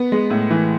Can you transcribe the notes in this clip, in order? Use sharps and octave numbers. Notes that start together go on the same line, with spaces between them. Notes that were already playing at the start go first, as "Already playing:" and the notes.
Already playing: B3
G#3
A2
E3